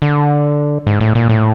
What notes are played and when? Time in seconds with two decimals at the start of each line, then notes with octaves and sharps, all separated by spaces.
0.02 D3
0.87 G#2
1.01 A2
1.15 A#2
1.29 A2